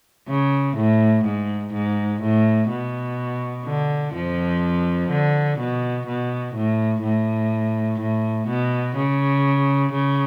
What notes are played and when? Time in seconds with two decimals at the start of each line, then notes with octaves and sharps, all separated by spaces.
0.28 C#3
0.76 A2
1.25 G#2
1.73 G#2
2.21 A2
2.70 B2
3.65 D3
4.14 F2 F3
5.10 D3
5.59 B2
6.07 B2
6.55 A2
7.02 A2
7.99 A2
8.47 B2
8.96 C#3
9.92 C#3